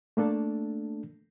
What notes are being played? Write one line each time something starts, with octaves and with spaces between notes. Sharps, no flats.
A3 A#3 D4 A4